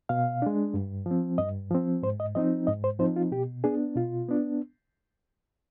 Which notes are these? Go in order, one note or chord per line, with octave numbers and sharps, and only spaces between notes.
B2 F5
G#3 D4
G2
F3 C4
G2 D#5
F3 C4
G#2 C5
D#5
F3 C4 D#4 D#5
G#2 D#5
C5
F3 C4 D#4 C5
F4
B2 G4
B3 D4 G#4
B2 F4
B3 D4